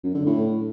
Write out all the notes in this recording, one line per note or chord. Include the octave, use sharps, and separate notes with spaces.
F#2
D3
A2